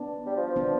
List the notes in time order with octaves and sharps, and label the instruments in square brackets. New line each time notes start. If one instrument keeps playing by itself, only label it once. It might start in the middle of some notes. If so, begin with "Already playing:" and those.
Already playing: [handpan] B3 D4
[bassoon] G3
F3
F3
[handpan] B3 D4